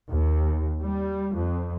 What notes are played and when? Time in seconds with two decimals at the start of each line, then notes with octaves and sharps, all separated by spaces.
0.11 D#2
0.82 G3
1.34 F2